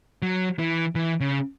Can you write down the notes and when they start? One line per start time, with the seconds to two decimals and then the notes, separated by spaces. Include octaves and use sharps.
0.22 F#3
0.59 E3
0.95 E3
1.20 C#3